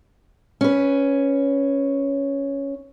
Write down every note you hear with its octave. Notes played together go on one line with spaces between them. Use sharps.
C#4 B4